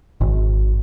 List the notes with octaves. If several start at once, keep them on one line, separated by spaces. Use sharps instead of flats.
G#1